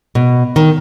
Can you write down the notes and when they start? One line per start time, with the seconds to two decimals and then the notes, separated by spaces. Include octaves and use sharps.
0.15 B2
0.56 D#3